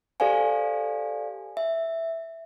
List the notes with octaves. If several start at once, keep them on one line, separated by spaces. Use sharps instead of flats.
G4 A4 C5 D5 F5 G#5
E5